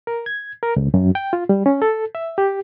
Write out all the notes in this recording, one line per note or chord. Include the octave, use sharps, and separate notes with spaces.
A#4
G#6
A#4
C#2
F#2
G5
F4
G3
C#4
A4
E5
G4